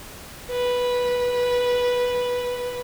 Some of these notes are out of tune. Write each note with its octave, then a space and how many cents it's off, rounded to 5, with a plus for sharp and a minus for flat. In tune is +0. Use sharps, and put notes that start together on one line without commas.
B4 -10